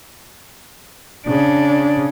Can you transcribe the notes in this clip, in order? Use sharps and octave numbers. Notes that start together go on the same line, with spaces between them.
C#3 D4